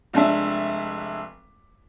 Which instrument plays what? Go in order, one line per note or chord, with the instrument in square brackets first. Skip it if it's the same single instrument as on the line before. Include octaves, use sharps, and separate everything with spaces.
[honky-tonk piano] F1 G#3 D4 E5